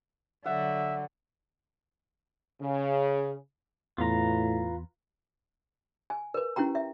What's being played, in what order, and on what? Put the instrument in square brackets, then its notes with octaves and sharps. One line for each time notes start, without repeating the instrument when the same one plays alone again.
[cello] D3 F#3 [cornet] E5 [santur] F#5
[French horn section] C#3
[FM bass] E2 [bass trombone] A2 [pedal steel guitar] F4 B4 A#5
[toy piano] G#5
A#4 B4
C#4 E4 G4 G5 A#5
E5